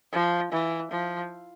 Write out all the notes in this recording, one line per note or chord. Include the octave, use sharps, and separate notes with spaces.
F3
E3
F3